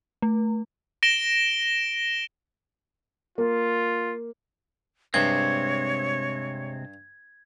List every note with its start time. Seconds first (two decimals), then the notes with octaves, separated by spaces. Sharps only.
0.22 A3
1.03 A#6 D7 E7 G7
3.38 A#3 F4
5.14 G2 C3 G#3 C4 C#5 G#6